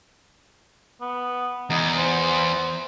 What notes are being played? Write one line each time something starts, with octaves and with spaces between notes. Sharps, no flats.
B3
E2 D#4
C5